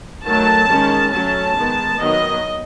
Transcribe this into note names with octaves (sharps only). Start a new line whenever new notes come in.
D#3 F#3 A3 A5
D#3 G#3 C#4
F#3 A3 C#4 A5
D#3 G#3 B3
D#3 F#3 B3 D#5